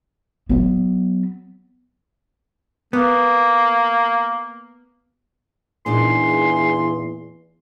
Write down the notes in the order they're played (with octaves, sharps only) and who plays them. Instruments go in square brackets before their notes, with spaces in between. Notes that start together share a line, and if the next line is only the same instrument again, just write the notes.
[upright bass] F#3 B3
[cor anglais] A#3 [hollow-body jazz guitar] B3
[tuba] E2 [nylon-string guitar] A#2 D4 D#4 [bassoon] G#4 [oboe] C6